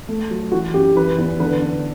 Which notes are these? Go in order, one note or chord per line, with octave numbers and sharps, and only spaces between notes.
A3
F#3
E3 F#4
F#2 G4
E3 B4
E2
D3 B4
D3